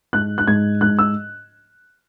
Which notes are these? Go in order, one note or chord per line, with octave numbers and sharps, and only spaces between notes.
G#2 F#6
F#6
G#2 G#6
G#2 F#6
E6